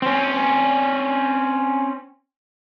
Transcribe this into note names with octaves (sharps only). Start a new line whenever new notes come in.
C4 C#4